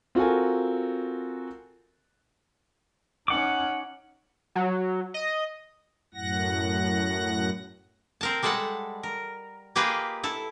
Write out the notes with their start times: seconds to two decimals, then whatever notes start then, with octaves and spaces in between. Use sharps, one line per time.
0.15 C4 F4 F#4 A4 A#4 G#5
3.28 C#4 D#4 F#5 D6
4.55 F#3
5.14 D#5
6.14 F#2 A2 F#5 A#6
8.21 C4 A#4 A5
8.43 G3 G#3 A4 B4 F#5 A5
9.03 A#4
9.76 A#3 F4 G4 G#4 B4 D#5
10.24 E4 A4